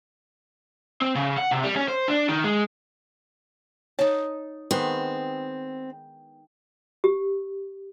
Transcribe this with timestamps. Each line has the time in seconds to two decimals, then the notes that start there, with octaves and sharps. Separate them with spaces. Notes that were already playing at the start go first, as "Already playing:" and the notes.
1.01 C4
1.15 C#3
1.37 F#5
1.51 C3
1.64 G3
1.76 C#4
1.88 C5
2.08 D4
2.29 D#3
2.44 G#3
3.99 D#4 C#5 A5
4.71 D#3 G#3 B3 C4
7.04 G4